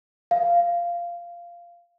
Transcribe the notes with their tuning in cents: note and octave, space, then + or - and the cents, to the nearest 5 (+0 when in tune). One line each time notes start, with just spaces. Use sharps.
F5 -10